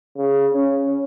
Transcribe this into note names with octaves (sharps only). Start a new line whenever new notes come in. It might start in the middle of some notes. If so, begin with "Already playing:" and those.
C#3
C#4